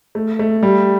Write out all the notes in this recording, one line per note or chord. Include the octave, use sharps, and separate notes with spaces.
A3
A3
G3